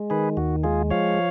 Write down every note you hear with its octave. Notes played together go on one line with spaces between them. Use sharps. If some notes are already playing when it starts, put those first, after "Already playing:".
Already playing: G#3
D#3 G#4 B4
D#2 F#4
G#3 F4 G#4
F3 C#5 F5